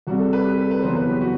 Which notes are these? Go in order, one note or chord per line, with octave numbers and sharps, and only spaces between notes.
C2 C3 G3 F#4
A4
B4
G4
A4
B4
F#1 E2 B2 F#3 C5
B4
G4
F#4